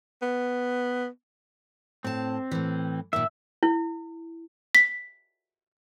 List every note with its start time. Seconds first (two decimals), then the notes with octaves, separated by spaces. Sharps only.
0.22 B3
2.04 A2 C4 A5
2.51 A2 E3
3.13 A#2 D#3 E5
3.63 E4
4.75 B6